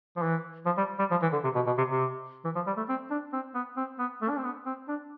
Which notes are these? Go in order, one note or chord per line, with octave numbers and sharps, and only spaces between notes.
F3
E3
F3
G3
G3
F3
E3
D3
C3
B2
B2
C3
C3
E3
F3
G3
A3
C4
D4
C4
B3
C4
B3
A3
D4
C4
B3
C4
D4